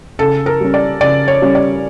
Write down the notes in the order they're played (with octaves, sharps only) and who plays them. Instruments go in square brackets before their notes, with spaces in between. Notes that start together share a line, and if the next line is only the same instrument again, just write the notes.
[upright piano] C#3 [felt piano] A4
[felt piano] A#4
[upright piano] G3 C#4
[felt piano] D5
[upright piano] C#3 [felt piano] D5
[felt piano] C#5
[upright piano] G3 C#4
[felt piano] D5